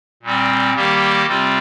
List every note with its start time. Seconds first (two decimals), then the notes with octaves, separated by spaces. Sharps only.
0.23 A#2 G3 C4
0.74 D#3 G3 A#3 G4
1.26 C3 G3 C4 F4